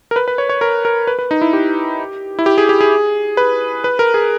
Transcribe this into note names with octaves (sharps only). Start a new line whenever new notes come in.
A#4
B4
B4
C#5
C#5
A#4
A#4
B4
B4
D#4
E4
G4
E4
G4
G#4
G4
G#4
B4
B4
A#4
G#4